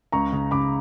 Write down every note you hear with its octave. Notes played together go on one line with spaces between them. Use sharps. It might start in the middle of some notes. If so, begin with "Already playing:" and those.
C#2 A#5 C#6
C#3
C#3 B5 D6